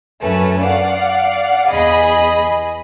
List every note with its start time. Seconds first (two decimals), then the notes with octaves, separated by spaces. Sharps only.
0.22 F#2 A3 C#4 B4
0.63 D5 F5 F#5
1.69 E2 G#4 D#5 B5